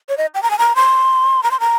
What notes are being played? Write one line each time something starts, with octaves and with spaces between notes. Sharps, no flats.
C#5
D#5
G5
A#5
G#5
A#5
C6
A#5
C6
A#5